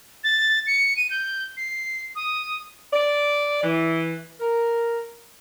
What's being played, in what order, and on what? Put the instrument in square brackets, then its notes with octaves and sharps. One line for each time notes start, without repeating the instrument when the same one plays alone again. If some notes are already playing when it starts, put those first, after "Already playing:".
[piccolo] A6
C#7
D#7
G6
C7
D#6
[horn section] D5
E3
A#4